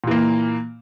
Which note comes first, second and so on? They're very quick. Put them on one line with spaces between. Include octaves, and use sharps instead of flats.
A#2 E3 A#3